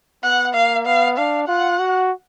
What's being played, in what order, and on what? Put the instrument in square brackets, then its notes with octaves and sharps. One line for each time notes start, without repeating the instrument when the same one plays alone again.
[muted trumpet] B3 [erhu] F#5
[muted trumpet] A#3 [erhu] F5
[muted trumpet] B3 [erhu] F5
[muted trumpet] D4 [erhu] F5
[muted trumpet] F4 [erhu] F#5
[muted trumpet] F#4